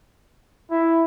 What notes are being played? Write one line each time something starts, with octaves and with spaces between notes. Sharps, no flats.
E4